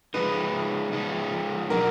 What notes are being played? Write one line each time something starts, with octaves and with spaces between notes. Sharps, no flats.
F3 G#3 D#4 B4
F3 G#3 D#4
B2 F#3 D4 A#4